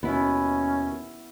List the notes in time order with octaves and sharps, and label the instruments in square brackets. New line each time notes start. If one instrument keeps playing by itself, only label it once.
[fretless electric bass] D#2 B2 [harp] B3 E4 [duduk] C#4